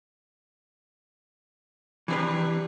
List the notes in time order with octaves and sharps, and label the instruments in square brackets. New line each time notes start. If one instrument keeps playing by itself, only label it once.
[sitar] B2 D4 G4 [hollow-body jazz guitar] E3 C4 B4